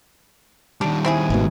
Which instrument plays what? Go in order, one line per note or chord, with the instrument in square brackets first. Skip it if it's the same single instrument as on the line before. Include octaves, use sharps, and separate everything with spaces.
[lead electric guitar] D#3 G3 [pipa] D4
[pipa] C4 E4 G#4
[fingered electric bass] G#1 G#2 B2